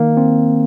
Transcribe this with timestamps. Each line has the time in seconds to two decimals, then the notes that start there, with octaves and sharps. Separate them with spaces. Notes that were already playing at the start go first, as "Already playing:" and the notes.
Already playing: D#3 A#3
0.17 C4